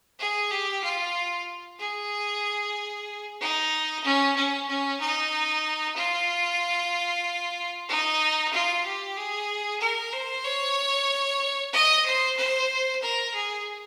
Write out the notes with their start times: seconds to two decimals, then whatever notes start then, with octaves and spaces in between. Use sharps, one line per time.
0.19 G#4
0.51 G4
0.83 F4
1.80 G#4
3.40 D#4
4.04 C#4
4.35 C#4
4.68 C#4
5.00 D#4
5.96 F4
7.89 D#4
8.53 F4
8.85 G4
9.16 G#4
9.80 A#4
10.13 C5
10.45 C#5
11.73 D#5
12.05 C5
12.37 C5
13.02 A#4
13.34 G#4